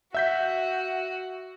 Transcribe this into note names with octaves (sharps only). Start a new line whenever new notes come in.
F#4 E5 G6 B6